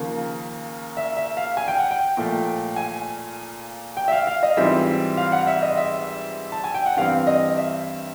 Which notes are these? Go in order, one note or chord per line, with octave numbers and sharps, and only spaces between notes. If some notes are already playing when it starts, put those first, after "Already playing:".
Already playing: D#2 C#3 F3 A#3
E5
E5
F5
G#5
G5
F#5
G5
A#2 F3 A3
G#5
G5
E5
F5
F5
D#5
G#2 E3 G3 C4 F4 E5
F5
F#5
E5
D#5
E5
A5
G#5
G5
F#5
G2 E3 G3 C4 F5
D#5
E5